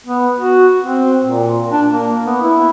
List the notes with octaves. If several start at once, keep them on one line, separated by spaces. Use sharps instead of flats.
B3
F#4
C4
A#2
D4
A#3
B3
E4